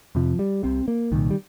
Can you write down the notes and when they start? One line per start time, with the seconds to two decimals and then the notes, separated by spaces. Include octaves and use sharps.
0.15 F2 C3 F3
0.39 G3
0.63 C2 C3 C4
0.88 A#3
1.12 C2 A#2 D#3
1.30 G3